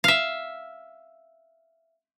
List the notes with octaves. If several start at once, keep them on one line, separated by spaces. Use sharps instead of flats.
E5 F5